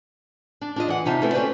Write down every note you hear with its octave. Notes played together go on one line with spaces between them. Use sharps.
D4
D4 F4 D#5
E3 F#5
C3 C4 D#4 F4 E5 A5
A3 C#4 E4 A4 B4
C4 C#4 F#4 B4 C5 D5